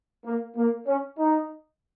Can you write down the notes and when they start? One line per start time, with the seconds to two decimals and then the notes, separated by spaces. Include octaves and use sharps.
0.25 A#3
0.57 A#3
0.87 C#4
1.19 D#4